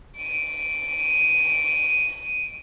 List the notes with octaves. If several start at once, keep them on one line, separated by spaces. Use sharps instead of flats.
D7 D#7